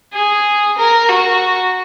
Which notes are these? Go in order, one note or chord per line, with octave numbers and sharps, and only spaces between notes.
G#4
A#4
F#4